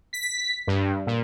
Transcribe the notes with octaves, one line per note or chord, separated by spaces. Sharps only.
B6
G2
A#2